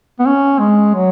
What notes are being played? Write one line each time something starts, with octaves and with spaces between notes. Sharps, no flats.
B3
C#4
G#3
F#3